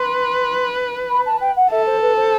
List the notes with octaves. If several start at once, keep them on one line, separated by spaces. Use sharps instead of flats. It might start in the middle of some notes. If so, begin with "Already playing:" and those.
Already playing: B4 C6
B5
A5
G5
F#5
A4 E5
C5
B4
C5